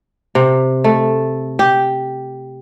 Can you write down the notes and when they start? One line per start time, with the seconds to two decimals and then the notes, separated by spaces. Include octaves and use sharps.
0.35 C3
0.84 A3
1.59 G4